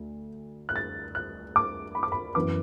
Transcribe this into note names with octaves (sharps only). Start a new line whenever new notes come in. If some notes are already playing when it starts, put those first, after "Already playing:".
Already playing: D2
F#6
A6
F#6
D6
B5
D6
B5
F#2 E3 B3 D6